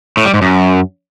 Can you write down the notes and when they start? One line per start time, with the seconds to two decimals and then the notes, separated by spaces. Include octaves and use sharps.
0.17 A2
0.25 G3
0.34 G#2
0.42 F#2